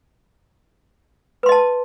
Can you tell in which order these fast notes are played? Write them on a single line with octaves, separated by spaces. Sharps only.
B4 C6 D#5 A5